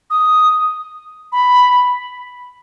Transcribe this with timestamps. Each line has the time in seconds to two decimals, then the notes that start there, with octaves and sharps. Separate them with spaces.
0.10 D#6
1.32 B5